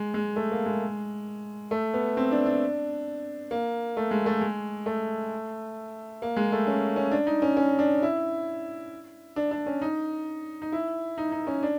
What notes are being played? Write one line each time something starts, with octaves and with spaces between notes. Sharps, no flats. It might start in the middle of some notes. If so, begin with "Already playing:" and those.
Already playing: G#3
G#3
A3
A#3
G#3
A3
B3
C4
D4
D4
A#3
A3
G#3
A3
G#3
A3
A#3
G#3
A3
C#4
C#4
D4
D#4
C#4
C#4
D4
E4
D4
D4
C#4
D#4
D#4
E4
D#4
D#4
C#4
D4